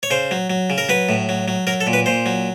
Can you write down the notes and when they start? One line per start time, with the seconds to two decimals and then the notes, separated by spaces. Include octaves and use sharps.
0.03 C#5
0.11 C#3 C5
0.31 F#3
0.50 F#3
0.70 C#3
0.78 A#4
0.89 F#3 B4
1.09 A2
1.29 F#3
1.48 F#3
1.67 F#3 A#4
1.81 A4
1.87 A#2
1.93 B4
2.06 A#2 C5
2.26 F#3